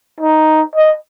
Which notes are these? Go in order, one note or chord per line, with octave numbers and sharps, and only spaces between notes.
D#4
D#5